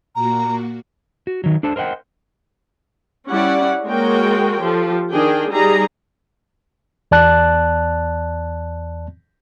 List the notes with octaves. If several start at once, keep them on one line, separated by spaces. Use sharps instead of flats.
A#2 A#3 F#4 A#5
F#4
D#3 F#3
D4 A4 C5 A5
A#4 C5 D#5 F#5 G5
G3 C#4 E4 D5 F#5
G#3 A#3 F#4 A#4 C#5 G5
F3 G4 A4
D#3 D4 G#4 G5
G3 D#4 G#4 A#5
E2 D5 A5 F#6